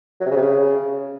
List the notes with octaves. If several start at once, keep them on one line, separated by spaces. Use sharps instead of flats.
F#3
C3
C#3
C3
C#3